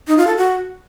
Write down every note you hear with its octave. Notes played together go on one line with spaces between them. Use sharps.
D#4
F4
A4
F#4